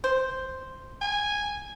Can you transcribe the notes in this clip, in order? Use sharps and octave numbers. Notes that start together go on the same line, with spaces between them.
C5
G#5